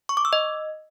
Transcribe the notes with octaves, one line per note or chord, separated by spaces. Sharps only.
C#6
D6
E6
D#5